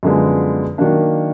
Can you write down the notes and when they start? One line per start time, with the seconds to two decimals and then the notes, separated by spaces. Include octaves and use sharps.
0.03 F#2 D3 F3 G#3 B3
0.78 D#3 F#3 A#3 D4